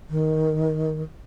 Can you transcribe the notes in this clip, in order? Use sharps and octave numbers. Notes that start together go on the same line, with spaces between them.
D#3